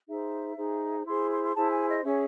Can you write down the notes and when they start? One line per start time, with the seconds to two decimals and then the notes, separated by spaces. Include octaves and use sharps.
0.08 D#4 G#4 C5 E5
0.57 D#4 G#4 C5
1.06 E4 G#4 C5 C6
1.30 C6
1.44 C6
1.55 E4 G#4 C5 A5
1.71 G#5
1.88 D#5
2.04 C#4 G#4 C#5 E5